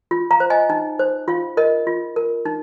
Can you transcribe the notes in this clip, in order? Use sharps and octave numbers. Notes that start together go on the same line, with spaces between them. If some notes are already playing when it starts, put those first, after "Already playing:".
F4
F5 A#5
C5
D#5 G#5
D#4
C5
F4 F5
A#4 D#5
F4
A#4
D#4